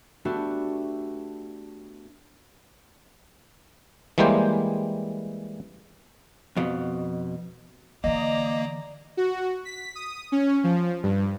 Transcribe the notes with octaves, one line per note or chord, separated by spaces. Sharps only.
A3 B3 D4 F#4 G4
E3 G3 G#3 A#3 C5 G5
F2 B2
D3 E3 A#3 D5 D#5 A#5
F#4
B6
D#6
C#4
F3
G2